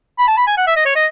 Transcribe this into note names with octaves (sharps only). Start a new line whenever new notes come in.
B5
A5
B5
G#5
F#5
E5
D#5
C#5
D#5